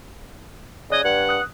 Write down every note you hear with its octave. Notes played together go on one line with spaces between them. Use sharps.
C#3 D5 D#5 F#6 G#6
G2 F#5
D#6 F#6